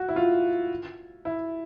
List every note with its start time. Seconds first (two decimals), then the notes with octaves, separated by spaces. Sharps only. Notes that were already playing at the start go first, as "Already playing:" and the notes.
Already playing: F#4
0.09 E4
0.16 F4
1.25 E4